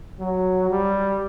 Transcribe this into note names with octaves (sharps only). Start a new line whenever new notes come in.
F#3
G3